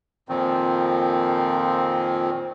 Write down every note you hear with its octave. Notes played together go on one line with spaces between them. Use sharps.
F2 A#2 D#3 F3 C4